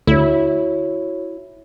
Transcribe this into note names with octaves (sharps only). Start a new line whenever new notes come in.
D2 E4 F#4 C#5